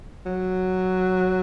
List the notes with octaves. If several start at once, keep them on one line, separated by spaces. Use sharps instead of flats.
F#3